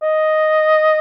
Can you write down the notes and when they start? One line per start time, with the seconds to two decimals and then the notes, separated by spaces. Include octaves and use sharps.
0.03 D#5